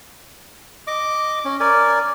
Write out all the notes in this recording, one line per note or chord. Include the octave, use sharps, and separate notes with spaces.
D#5 D6
C#4
A#4 D5 G#5